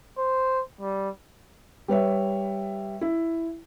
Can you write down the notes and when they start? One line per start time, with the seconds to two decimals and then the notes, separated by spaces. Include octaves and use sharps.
0.18 C5
0.81 G3
1.88 G3 B4 C#5 E5
3.01 E4